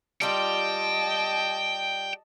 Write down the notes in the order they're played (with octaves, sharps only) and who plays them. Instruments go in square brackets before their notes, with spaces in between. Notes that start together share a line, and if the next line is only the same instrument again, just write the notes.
[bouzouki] G3 F4 [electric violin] D#5 A5 [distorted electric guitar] G5